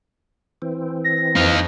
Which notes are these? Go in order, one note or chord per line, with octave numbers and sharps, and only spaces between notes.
E3 C4
A#6
F2 D#4 F5